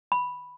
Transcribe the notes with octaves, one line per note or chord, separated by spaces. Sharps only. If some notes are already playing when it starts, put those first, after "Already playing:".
B5